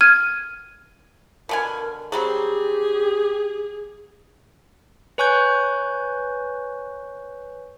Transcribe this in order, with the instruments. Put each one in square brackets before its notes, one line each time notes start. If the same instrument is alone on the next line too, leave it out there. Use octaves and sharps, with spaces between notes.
[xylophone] F6 G#6 D#7
[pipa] B2 D3 G#5 [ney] A#4
[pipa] F#3 G3 C4 [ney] G4 [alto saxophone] G#4
[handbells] B4 C#5 G#5 C#6 F#6 G6